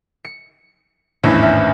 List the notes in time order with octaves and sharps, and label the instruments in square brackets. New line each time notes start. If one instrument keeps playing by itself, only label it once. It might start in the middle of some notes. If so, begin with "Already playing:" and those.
[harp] C#7
[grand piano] G#1 E2 A2 [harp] C#4 D4 E4
[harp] E5 F6